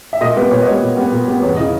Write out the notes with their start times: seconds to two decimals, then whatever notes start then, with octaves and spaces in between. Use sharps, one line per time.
0.13 E5
0.21 A#2 D#5
0.36 G3 B3 B4
0.51 A#2 C#5
0.62 D#5
0.66 G3 B3 C#5
0.82 A#2
0.97 G3 B3
1.12 A#2
1.27 G3 B3
1.42 E2 C#5
1.57 C#3 E3 D#5